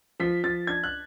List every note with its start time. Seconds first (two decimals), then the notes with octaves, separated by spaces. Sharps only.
0.20 F3 B6
0.44 F3 A6
0.67 D4 G#6
0.84 F#6